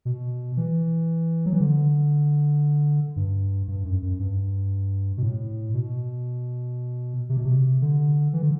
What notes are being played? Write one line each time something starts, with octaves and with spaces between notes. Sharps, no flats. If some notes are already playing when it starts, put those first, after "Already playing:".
B2
E3
F#3
E3
D3
G2
G2
F#2
F#2
G2
B2
A2
B2
C3
B2
C3
D3
E3
D3